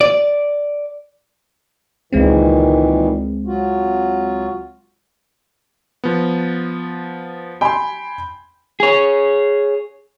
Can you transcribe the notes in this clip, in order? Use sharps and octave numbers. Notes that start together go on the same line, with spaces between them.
D5
C#2 A#2 D#3 E3 G#3 C4
F#3 F4 F#4
F3 B3
G5 G#5 B5 C6
G#4 C#5